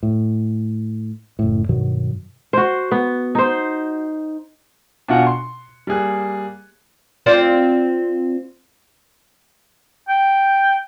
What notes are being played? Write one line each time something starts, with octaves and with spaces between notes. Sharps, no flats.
A2
F#1 A2
G2 B2 D#3 F#3
F#4 C5
B3
D#4 C5
B2 D4 F4 F#4 F#5 G#5
C6
G3 A#3 G#4 F#6
C4 F4 D5
G5